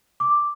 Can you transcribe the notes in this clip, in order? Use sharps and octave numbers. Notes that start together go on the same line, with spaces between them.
D6